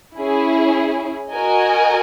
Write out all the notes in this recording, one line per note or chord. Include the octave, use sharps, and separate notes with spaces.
C#4 E4 G#4
F#4 A#4 D#5 G#5